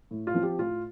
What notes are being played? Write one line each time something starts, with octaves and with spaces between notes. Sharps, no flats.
A2
F4
F3 C4
G4
A2 F4